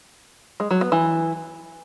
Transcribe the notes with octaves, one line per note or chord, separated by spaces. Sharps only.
G#3
F#3
B3
E3